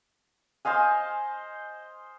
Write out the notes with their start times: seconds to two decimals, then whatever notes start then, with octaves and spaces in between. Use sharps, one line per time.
0.65 C5 D#5 F5 G#5